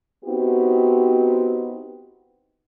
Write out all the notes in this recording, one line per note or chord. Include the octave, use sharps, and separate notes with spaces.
B3 C4 D#4 E4 F#4 G4